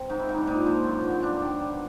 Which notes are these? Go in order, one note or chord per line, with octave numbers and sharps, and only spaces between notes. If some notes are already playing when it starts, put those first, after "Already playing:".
Already playing: C3
G#2 D#4
E4
G#2 D#4
D4
A#2 D#4
F3
F#2
D3
G2 D4
D#3
B2